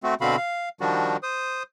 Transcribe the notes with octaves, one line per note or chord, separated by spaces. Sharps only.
A3 C4 F#4
B2 D3 C4 F#4 F5 B5
F5
D#3 F3 G3 D4 F#4
C5 D#6